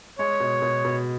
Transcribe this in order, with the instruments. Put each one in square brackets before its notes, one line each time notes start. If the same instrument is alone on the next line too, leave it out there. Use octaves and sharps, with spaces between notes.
[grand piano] G#3 [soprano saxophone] C#5
[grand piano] B2
B2
B2